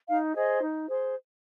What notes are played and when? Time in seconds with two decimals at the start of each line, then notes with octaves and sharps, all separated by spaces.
0.08 D#4 F5
0.35 G#4 C5 D#5
0.62 D#4
0.88 G#4 C5